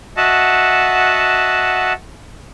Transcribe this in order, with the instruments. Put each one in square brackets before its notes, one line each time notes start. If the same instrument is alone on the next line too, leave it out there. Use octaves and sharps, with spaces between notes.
[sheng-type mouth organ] F#4 D#5 E5 F#5 A5